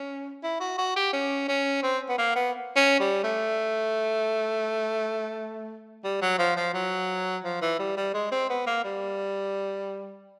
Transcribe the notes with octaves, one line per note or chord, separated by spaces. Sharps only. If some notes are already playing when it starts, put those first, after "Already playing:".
Already playing: C#4
E4
F#4
F#4
G4
C#4
C#4
C4
B3
A#3
B3
C#4
G3
A3
G3
F#3
F3
F3
F#3
F3
E3
G3
G3
G#3
C4
B3
A#3
G3